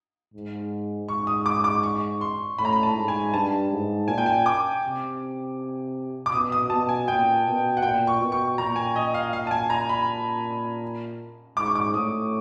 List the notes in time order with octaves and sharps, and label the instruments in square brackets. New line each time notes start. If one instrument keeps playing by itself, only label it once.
[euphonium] G#2
[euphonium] G#2 [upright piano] C#6
[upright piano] D#6
D6
D6
C#6
C6
[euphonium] A2 [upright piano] B5
[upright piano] A#5
B5
A5
[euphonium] G#2
[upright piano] G#5
[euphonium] G2 [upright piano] A5
[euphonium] G#2
[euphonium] A#2 [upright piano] G#5
[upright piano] G5
G#5
D6
[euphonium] C3
[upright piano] D6
[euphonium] B2 [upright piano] D#6
[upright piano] D#6
[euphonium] B2 [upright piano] A5
[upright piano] G#5
[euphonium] A#2 [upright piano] G5
[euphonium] B2
[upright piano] F#5
[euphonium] A#2 [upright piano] G5
[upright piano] C#6
[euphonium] B2
[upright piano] C#6
[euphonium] A#2 [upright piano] A#5
[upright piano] G#5
D#5
F5
F5
A5
G#5
A#5
B5
[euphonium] G#2 [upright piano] D6
[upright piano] C#6
D6
[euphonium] A2 [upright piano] D#6